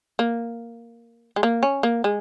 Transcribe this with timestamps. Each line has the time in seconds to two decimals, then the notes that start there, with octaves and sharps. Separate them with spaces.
0.19 A#3
1.36 G#3
1.43 A#3
1.63 C#4
1.83 A#3
2.04 G#3